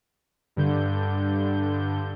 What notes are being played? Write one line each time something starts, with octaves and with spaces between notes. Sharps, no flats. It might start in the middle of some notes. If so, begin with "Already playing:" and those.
G2 D3 G6